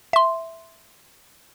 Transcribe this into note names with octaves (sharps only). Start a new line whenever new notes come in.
E5 C6